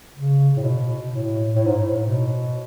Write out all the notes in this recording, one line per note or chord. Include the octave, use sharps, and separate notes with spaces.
C#3
A2
B2
A2
A2
G#2
A2
B2